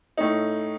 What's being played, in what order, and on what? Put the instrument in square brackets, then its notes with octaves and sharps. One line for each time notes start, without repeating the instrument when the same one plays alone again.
[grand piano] A2 A3 D#4